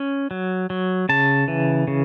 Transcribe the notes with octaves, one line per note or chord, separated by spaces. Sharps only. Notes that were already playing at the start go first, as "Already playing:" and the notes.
Already playing: C#4
F#3
F#3
C#3 A5
E3
C#3